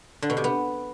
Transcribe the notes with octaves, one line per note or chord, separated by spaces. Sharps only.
D3
B2
C3
B3